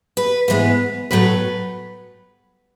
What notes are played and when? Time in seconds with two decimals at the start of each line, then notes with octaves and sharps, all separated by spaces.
0.17 B4
0.48 G#2 E3 G#3 B3 B4
1.11 A2 F#3 A3 B4